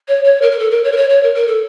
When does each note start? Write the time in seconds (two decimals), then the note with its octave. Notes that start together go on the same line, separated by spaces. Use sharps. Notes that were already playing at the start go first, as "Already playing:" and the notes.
0.07 C#5
0.24 C#5
0.41 A#4
0.51 A#4
0.58 A4
0.70 A#4
0.83 C#5
0.92 A#4
0.96 C#5
1.09 C#5
1.22 A#4
1.34 A#4
1.47 A4